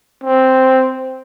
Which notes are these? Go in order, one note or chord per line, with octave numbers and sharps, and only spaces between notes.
C4